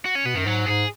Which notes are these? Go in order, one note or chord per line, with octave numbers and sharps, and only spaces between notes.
F#4
C#4
B2 B3
F#2 D#3
G#2 F#3
G#2 G#4